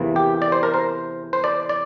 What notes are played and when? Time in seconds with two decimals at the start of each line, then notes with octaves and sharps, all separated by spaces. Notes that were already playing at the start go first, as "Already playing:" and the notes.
Already playing: E2 C3 E3 A#3
0.16 G4
0.42 D5
0.52 C5
0.63 A#4
0.74 C5
1.33 C5
1.44 D5
1.69 D5